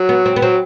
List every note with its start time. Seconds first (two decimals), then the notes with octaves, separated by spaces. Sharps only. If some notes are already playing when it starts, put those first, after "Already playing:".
Already playing: F#3
0.09 B3
0.26 C4
0.36 B3
0.42 F#3 C4